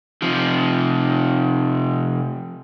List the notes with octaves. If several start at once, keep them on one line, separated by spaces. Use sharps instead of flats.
C3 F3